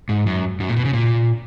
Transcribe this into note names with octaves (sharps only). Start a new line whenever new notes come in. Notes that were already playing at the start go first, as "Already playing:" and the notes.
G#2
F#2
F#2
A#2
B2
C#3
A#2